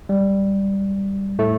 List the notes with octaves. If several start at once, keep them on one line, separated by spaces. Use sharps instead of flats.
G3
A2 A3